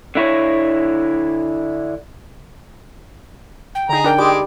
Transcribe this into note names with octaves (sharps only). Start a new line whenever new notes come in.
D3 E4 C#5
G5
D3 D#4 G#4 A#5
D4 A#4 G5
G3 G#3 D6